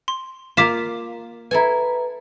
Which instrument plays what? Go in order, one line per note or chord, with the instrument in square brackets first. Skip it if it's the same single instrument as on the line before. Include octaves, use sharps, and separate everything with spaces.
[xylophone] C6
[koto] A#3 F4 [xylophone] D6 B6 E7
[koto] E4 A4 G#5 [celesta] B4 A#5